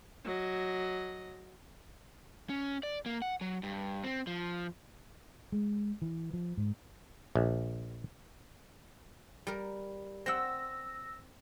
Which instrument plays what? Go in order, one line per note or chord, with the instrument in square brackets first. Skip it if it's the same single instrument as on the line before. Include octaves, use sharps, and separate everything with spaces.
[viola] F#3 D#5
[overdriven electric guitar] C#4
D5
A#3
F#5
F#3
G2
C4
F3
[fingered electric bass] G#3
E3
F3
G#2
[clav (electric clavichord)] A#1
[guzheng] G3 A#4
[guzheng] C4 F#5 [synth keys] E6 A#6